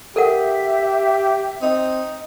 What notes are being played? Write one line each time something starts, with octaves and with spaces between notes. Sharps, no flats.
G4 A4 A#4 E5 F#5
C4 D#4